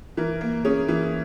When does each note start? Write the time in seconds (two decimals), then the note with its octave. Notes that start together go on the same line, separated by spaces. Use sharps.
0.17 E3 A#4
0.41 A#3
0.65 C#4 G#4
0.88 E3